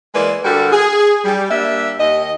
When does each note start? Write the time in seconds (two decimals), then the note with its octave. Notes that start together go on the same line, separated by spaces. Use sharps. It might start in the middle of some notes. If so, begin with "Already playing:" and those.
0.14 E3 G#3 A#3 B4 D5
0.44 D3 G3 F#4 A4 A#4
0.73 G#4
1.25 G3
1.51 G3 A#3 D4 E5
1.99 D#2 D#5